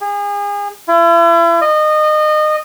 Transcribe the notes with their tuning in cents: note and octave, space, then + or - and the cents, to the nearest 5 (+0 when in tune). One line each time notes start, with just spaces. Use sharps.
G#4 -35
E4 +40
D#5 -25